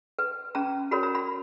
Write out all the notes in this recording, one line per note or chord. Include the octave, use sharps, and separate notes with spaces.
B4
C#4 A#5
F#4 A#4 C#5 B5
A#5
B5